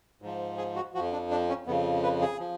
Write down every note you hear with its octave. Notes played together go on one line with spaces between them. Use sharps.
G#2 F3
G#4
F#4
F2 F3 F#4
D4
D4
C#4
F2 C#3 F3 B3
B4
G#4
F3